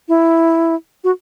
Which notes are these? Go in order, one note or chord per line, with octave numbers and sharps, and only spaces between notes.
E4
F#4